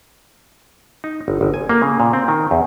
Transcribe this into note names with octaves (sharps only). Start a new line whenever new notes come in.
D#4
G1
G1
G#5
A#3
C#3
A#2
C4
D#3
E2